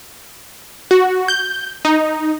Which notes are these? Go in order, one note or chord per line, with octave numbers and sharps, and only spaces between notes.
F#4
G6
D#4